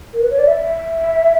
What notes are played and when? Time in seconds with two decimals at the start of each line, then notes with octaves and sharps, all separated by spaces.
0.13 A#4
0.21 B4
0.30 C#5
0.38 D5
0.47 E5